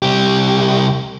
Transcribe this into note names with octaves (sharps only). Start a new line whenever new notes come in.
C2 G4